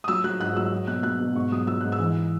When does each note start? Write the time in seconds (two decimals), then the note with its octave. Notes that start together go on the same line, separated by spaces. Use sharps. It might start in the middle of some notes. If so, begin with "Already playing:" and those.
0.04 D#6
0.08 F#3 E6
0.24 F#3 F#6
0.40 G#2 F#6
0.56 F#3 E6
0.72 F#3
0.87 B2 F#6
1.03 F#3 F#6
1.20 B2
1.35 G#2 C#6
1.52 F#3 D#6
1.67 F#3 E6
1.81 G#2 F#6
1.92 E6
1.99 E3